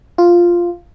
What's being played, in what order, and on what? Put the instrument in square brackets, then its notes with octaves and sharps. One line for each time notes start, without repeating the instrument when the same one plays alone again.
[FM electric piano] F4